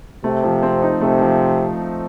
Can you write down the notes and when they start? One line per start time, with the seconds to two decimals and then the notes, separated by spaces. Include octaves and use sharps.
0.24 C3 A3
0.44 F3
0.63 C4
0.82 D#4
1.01 C3 A3
1.21 F3